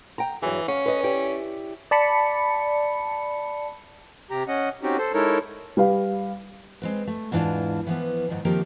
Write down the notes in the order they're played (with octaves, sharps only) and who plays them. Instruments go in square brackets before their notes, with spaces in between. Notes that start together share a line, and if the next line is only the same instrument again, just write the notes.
[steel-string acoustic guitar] G5 A#5
[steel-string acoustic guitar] G2 F#3 G#4 [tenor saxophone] E3
[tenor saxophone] C#4 [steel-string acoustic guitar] F5
[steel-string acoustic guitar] B4 D#5
E4 G4 D5
[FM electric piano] D5 A5 B5 C#7
[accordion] C3 G4 A#5
C#4 D#5 F#5
C4 C#4 D#4 F#4 G4
A4 C5
G#3 D#4 E4 A4 A#4 C#5
[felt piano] G3 B4 F5
[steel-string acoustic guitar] G#3 C4 B4
A3
E2 G#2 E3 D4 F4 A5
E3 F3 B3
G#2 D#3 F3
D#3 F3 A#3 C4 G4 A#4